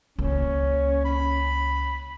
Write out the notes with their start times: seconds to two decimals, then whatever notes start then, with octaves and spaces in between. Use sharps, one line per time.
0.18 C#2 A#3 C#4
1.05 B5